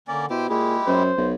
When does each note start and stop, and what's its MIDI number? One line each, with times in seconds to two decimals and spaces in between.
0.08 0.29 50
0.08 0.26 58
0.08 0.26 61
0.08 0.26 74
0.30 0.46 47
0.30 0.47 64
0.30 0.47 67
0.30 0.47 72
0.30 0.47 79
0.49 0.79 46
0.49 1.03 56
0.49 1.03 64
0.49 1.03 67
0.49 0.76 68
0.87 1.12 42
0.87 1.28 72
1.17 1.34 35